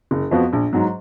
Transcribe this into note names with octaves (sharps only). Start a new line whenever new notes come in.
F#1
F2 F3 B3 F#4
A#1
G#2 F#3